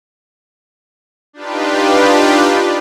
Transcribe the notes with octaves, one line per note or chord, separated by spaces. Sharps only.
D4 D#4 F4 G4 B4